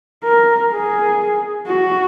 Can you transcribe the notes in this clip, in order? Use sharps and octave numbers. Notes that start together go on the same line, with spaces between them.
A#4
G#4
F#4